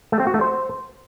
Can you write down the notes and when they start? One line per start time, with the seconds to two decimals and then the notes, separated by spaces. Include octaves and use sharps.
0.12 A3
0.20 C4
0.27 F#4
0.34 A3
0.41 C5